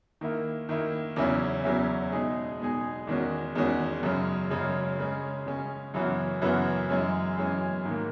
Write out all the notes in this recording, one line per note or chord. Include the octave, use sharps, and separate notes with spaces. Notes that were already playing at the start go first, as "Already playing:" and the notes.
D#3 A#3 E4
D#3 A#3 E4
E2 C#3 F#3 C#4 E4
E2 C#3 F#3 C#4 E4
B2 G#3 D#4 G#4
B2 G#3 D#4 G#4
E2 D#3 G#3 C#4 F#4
E2 D#3 G#3 C#4 F#4
F#2 C#3 G#3 C#4
F#2 C#3 G#3 C#4
C#3 G#3 C#4
C#3 G#3 C#4
F#2 C#3 E3 B3 F#4
F#2 C#3 E3 B3 F#4
F#2 E3 G#3 C#4
F#2 E3 G#3 C#4
G#2 D#3 A#3